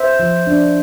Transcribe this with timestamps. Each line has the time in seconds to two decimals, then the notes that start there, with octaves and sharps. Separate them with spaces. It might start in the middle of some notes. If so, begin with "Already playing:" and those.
Already playing: C5 E5
0.20 F3
0.47 D4